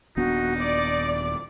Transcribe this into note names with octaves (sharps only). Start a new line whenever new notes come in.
D#1 B3 D4 D#4 F#4
D5 D6